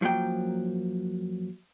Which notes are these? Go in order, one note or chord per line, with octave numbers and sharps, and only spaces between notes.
F#2 F3 F#3 A#3 G5